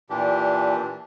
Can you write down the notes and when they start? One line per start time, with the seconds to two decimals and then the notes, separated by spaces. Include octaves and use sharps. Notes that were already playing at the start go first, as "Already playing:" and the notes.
0.10 A#2 E3 D4 G4